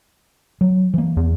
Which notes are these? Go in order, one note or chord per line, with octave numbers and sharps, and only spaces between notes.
F#3
E3 A#3
E2